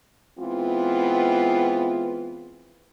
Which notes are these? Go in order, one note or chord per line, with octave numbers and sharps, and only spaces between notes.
E3 G#3 B3 C4 F4